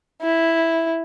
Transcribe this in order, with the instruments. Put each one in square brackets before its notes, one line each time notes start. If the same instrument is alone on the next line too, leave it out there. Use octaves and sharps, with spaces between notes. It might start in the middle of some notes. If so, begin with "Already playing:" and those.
[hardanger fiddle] E4